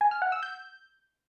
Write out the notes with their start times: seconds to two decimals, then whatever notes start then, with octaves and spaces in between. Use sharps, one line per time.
0.01 G#5
0.11 F6
0.22 F#5
0.32 E6
0.43 G6